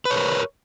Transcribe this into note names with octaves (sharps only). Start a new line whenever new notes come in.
A#4 B4 C#5